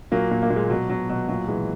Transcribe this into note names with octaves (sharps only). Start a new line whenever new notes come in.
A#2 F#3 A#3
A#2
A#3
A#2
G#3
B2 F#3
B2 F#3
B2 F#3
A#2 F#3
A#2 E3 G#3